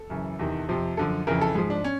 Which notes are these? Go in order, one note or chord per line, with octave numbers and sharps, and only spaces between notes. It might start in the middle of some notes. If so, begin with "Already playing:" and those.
Already playing: A4
F#2 C#3 E3
E2 C3 D#3
F2 C3 F3
F#2 D3 F3 A4
F2 C#3 E3 A#4
A4
G#2 F3 G#4
D4
C#4